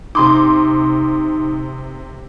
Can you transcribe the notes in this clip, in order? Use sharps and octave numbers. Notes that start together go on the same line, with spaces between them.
C3 D#4 C6 D6 D#6